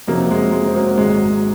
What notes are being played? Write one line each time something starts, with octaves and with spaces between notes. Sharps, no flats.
F2 C3 F3 F#3 A#3
G#3
G#3
C4
F#3 A#3
G#1 G#2 F#3 G#3